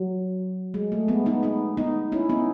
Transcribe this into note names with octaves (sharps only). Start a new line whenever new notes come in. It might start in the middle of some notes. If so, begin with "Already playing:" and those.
Already playing: F#3
G#3
A3
G#3 B3
B3 D#4
B3 D#4
B3 D#4
C#4 E4
B3 D#4